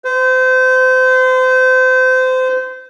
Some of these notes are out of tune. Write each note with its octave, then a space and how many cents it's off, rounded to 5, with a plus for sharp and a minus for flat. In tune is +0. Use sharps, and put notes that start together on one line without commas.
C5 -30